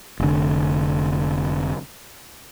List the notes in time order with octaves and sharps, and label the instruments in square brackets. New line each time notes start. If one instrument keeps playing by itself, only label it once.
[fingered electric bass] F1 D3